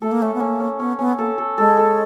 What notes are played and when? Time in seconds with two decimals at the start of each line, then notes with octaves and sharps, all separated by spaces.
0.01 A3 A4
0.11 A#3
0.21 A3 C#4
0.34 B3
0.40 A#3 C#4
0.60 C#4
0.79 B3 C#4
0.99 B3 C#4
1.18 A#3 A4
1.38 A4
1.58 G#3 A4
1.77 A4